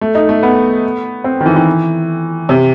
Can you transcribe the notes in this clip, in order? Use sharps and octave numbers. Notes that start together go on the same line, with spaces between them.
A3
D#4
A3
B3
C4
D#3
E3
E3
C3